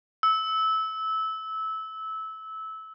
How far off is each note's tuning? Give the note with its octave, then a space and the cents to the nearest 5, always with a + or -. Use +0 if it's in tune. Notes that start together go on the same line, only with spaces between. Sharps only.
E6 -20